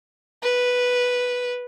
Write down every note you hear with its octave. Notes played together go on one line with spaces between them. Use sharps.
B4